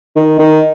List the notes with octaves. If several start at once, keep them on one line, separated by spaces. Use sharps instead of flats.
D#3
D#3